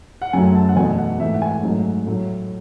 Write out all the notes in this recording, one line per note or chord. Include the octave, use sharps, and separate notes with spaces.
F#5
F#2 C#3 F#3 A3 G#5
A5
F#5
E2 B2 A3 G#5
F#5
G#2 E3 A3 E5
F#5
G#5
G#2 F#3 A3
A2 F#3 A3